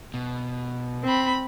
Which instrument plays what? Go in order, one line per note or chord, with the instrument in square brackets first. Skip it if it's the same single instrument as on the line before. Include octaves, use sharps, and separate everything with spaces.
[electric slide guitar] B2
[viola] C4 B5